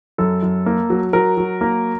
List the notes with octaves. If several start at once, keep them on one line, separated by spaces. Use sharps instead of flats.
F#2 A4
F#2
A#3
F#3
F#3 A#4
F#3
A#3